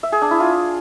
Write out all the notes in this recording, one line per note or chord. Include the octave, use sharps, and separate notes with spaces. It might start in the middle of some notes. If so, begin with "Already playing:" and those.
E5
G#4
D4
E4
F4